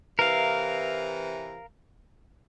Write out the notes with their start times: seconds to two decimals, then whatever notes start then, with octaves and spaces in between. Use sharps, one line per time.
0.19 C3 E3 A#4 F5